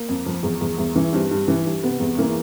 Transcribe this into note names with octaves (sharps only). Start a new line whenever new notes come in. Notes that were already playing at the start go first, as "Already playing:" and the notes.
Already playing: A#3
F2
F3
E2
E2
E2
E3
G2 C4
G2
E3
G2
C3 B3
E2
E3 A#3